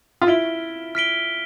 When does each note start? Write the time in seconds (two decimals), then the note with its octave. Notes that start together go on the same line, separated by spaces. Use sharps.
0.21 F4
0.27 E4 F6 B6 D7 G7
0.95 F6 B6 D7 G7